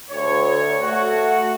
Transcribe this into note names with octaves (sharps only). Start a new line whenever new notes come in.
D2 C#5
A3 F#4